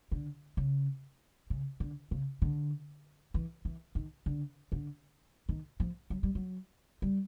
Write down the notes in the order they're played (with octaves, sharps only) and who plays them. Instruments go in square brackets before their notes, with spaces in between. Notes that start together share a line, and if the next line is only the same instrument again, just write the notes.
[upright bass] D3
C#3
C#3
D3
C#3
D3
E3
E3
D#3
D3
D3
D#3
F3
F#3
G3
F#3
G3